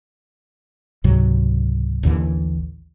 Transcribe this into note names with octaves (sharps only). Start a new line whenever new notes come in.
C#2 G#2 C3 F#3
A1 D#2 D3 E3